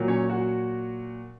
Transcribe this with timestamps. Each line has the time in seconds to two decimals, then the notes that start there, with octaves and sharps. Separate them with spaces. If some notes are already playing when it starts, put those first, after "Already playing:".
Already playing: A#2 F#3
0.08 C#4 C#5
0.30 F#4